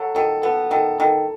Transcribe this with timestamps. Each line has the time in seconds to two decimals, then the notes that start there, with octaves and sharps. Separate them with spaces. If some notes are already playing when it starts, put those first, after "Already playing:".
Already playing: F#3 A4
0.15 D#3 A4
0.42 B3 A4
0.70 D#3 A4
0.98 D#3 A4